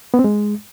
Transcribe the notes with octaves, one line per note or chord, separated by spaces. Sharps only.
B3
C4
G#3